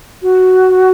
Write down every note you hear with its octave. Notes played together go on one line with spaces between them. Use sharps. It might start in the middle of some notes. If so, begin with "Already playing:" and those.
F#4